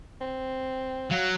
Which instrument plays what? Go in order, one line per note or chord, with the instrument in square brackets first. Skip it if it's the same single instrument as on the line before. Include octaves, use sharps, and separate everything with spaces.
[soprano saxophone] C4
[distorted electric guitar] F#3 [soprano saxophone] F5